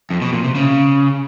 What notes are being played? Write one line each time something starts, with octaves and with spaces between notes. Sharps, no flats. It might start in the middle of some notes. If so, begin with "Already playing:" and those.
F2
B2
A#2
C3
C#3